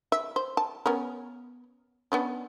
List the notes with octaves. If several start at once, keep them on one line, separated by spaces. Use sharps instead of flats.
E5
C5
A5
B3 C#4 A#4
B3 C#4 D4